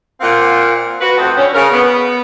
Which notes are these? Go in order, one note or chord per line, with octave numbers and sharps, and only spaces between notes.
A#2 C4 F4 A#4 F5 F#5
F#4 B4
F2 A3 C4 D#5 F#5
D3 C#4
C#3 A#4
B3